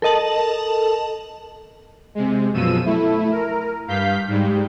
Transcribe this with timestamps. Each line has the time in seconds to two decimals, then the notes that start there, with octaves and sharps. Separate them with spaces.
0.02 A4 A#4 D#5 A5 F#7
2.15 C3 G#3
2.53 F#2 B2 F3 E6 D#7
2.85 A3 E4
3.31 A#4
3.88 G2 F5 G6 B6
4.28 G#2 G3